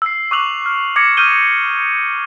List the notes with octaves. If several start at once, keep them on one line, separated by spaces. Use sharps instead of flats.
E6 C7
C#6 D6 E6 F#6 F7 F#7
F6
D6 G#6 A#6 C#7
D6 D#6 F6 G6 D#7 G7